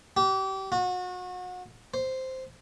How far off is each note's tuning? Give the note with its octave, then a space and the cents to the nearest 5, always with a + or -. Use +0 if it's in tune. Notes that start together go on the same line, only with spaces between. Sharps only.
G4 -30
F#4 -30
C5 -5